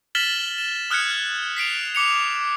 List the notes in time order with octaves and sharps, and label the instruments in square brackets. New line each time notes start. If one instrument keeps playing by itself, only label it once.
[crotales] F6 A6 B6 E7 F#7 G7
E7
D#6 F6 F#6 G#6 C#7
B6 C7 D7 F7
D6 C#7 F7